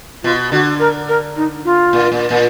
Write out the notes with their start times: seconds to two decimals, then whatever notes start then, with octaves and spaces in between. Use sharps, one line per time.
0.23 B2 F4
0.52 D3 F#4
0.80 A#4
1.09 A#4
1.36 D#4
1.65 F4
1.93 A#2
2.12 A#2
2.30 A#2